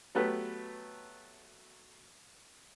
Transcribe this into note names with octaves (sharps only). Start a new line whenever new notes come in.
F#3 A3 B3 G4 B4